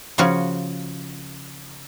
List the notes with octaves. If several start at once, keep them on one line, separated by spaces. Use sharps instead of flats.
C#3 F3 C#4 F#4